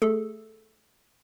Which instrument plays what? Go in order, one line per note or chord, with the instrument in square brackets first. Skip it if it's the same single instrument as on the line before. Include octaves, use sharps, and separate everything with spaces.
[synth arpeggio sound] A3 G#4 A4